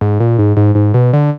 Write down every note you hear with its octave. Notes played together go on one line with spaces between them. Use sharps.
G#2
A#2
G#2
G#2
G#2
B2
D3